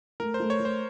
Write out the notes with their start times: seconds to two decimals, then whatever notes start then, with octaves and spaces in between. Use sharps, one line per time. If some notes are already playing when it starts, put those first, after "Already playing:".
0.20 A3 A#4
0.34 C5
0.40 A3
0.50 C#5
0.60 A3
0.65 C5